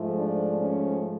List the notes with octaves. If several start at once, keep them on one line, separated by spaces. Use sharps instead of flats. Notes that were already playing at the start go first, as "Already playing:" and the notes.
Already playing: G#2 F3 A3
D4
C#4